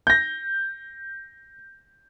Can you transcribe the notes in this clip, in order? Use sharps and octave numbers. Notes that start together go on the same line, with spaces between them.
G6 A#6